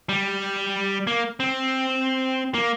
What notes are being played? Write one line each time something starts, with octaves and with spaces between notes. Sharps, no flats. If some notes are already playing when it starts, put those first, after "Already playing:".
G3
A#3
C4
A#3